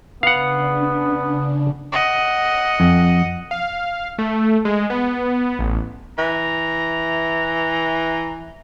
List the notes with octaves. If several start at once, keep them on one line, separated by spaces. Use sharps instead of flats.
C#3 B3 D4 F5 F#5
D#5 F#5
F2
F5
A3
G#3
B3
A1
E3 A#5